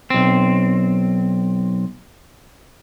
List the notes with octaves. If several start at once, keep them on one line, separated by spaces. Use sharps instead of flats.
B1 C4